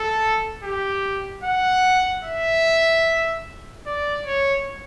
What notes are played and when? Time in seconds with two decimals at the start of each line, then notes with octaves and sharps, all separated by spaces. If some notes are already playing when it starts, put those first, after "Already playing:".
Already playing: A4
0.63 G4
1.44 F#5
2.25 E5
3.86 D5
4.26 C#5